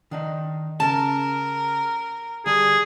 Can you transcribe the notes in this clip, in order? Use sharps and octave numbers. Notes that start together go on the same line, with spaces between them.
D#3 D4 D#4
C#3 A#4 A5
D3 G3 G#4